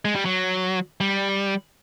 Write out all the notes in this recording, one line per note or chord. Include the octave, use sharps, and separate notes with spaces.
G#3
G3
F#3
G3